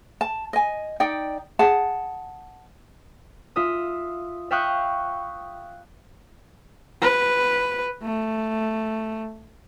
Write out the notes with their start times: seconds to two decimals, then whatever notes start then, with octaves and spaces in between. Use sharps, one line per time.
0.21 A5
0.53 D#5 G#5
1.00 D#4 D5 G5
1.59 G#4 F#5 A5
3.56 F4 E5 D#6
4.51 E5 F5 G5 C#6 D#6 F#6
7.02 B4
8.02 A3